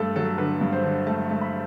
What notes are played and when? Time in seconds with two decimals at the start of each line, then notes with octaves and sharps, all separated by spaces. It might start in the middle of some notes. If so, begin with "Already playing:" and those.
Already playing: G2 A3 A4
0.16 F#3 A4
0.38 D3 B4
0.61 G2
0.73 C5
0.84 D3
1.07 A3 A5
1.30 A3
1.41 B5